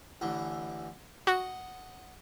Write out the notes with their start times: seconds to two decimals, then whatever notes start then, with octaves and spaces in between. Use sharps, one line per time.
0.21 A1 D3 E3
1.27 F#4 D#5 F#5